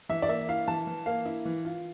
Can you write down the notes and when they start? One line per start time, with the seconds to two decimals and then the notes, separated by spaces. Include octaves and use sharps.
0.09 E3 E5
0.22 D5
0.29 A#3 E5
0.48 E4 F5
0.68 E3 A5
0.87 E3
1.06 A#3 F5
1.25 E4
1.45 E3
1.65 F4